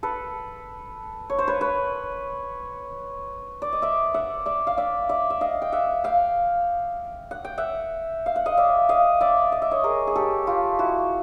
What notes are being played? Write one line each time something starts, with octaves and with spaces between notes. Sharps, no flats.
A4 B4
C#5
C5
B4 C#5
B4 C#5
D5
D#5
D5 E5
E5 F#5
D5 E5
F5
D5 E5
D5 E5
E5
D#5 F5
G5
E5 F#5
F5 G5
F#5
G5
E5 F#5
F5
F#5
D#5 F5
D5 E5
D#5 F5
D5 E5
D#5
E5
C#5 D#5
G#4 A#4
G#4
G4 A4
F4 G4
E4 F#4